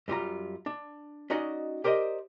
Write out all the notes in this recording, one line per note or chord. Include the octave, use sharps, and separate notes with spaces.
F#2 G3 F4 A#5
D4
C#4 D#4 F#4 D5 D#5
G4 A#4 C5 D5 D#5